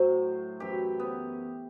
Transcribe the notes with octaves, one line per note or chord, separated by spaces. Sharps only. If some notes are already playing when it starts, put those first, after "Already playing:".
Already playing: A2 F#3 C5
F#2 E3 G4
B3